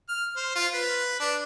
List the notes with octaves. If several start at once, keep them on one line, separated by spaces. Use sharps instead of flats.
F6
C5
F4
B4
D4